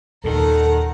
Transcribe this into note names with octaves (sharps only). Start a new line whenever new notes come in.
D#2 A#2 D#3 A4 A#4 F#5